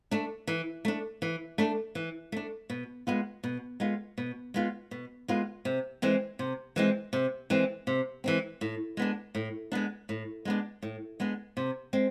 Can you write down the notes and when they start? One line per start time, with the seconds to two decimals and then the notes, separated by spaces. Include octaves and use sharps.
0.11 A3 D4
0.47 E3
0.85 A3 D4
1.22 E3
1.58 A3 D4
1.95 E3
2.32 A3 D4
2.70 B2
3.07 G#3 B3 F4
3.44 B2
3.80 G#3 B3 F4
4.18 B2
4.54 G#3 B3 F4
4.91 B2
5.28 G#3 B3 F4
5.65 C3
6.02 E3 G#3 C4
6.39 C3
6.76 E3 G#3 C4
7.13 C3
7.50 E3 G#3 C4
7.87 C3
8.24 E3 G#3 C4
8.61 A2
8.97 G#3 B3 D4
9.35 A2
9.72 G#3 B3 D4
10.09 A2
10.45 G#3 B3 D4
10.82 A2
11.20 G#3 B3 D4
11.57 C3
11.93 G#3 C4